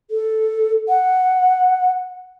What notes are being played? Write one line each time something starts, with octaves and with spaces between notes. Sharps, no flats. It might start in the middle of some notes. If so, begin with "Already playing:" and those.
A4
F#5